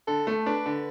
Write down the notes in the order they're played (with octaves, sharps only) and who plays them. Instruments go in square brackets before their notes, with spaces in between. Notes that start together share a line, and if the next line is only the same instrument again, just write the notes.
[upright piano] D3 [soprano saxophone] A4
[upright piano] A3
[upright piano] D4 [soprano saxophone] B4
[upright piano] D3